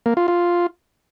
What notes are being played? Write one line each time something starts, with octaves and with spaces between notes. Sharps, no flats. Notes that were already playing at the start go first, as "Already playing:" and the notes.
A#3
F4
F4